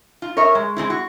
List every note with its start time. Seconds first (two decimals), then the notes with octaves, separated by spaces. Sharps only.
0.22 F4
0.37 A#4 C#5 D#5 E5
0.55 G#3
0.77 G#3 A3 C4 E4
0.90 F#4